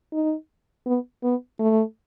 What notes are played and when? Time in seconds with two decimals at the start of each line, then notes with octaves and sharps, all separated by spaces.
0.13 D#4
0.86 B3
1.23 B3
1.59 A3